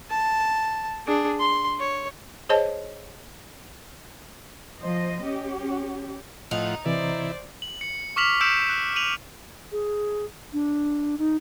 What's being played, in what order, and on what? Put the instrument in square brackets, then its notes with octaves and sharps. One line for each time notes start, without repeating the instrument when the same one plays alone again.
[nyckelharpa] A5
D4 G#4
C6
C#5
[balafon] G#4 C5 C#5 D#5 A5
[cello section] F3 C5 D#5
C#4 G4
[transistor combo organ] A2 F3 F#5 [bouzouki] D#4
[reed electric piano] C3 E3 [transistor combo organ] E4 [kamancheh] C5 D5
[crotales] F#7
C#7
C#6 D6 F6 B6 F7 F#7
E6 G6 B6 C#7 D7 E7
F#6
D#7 F7 F#7
[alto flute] G#4
D4
D#4